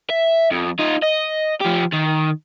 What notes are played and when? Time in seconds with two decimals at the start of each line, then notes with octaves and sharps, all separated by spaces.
0.10 E5
0.51 F2
0.79 D#4 F4
1.03 D#5
1.61 F3 G4
1.92 D#3